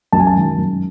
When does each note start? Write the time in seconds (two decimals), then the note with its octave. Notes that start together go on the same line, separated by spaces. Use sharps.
0.12 F#2 A5
0.20 G#5
0.27 A5
0.35 D#3 G#3
0.58 F#2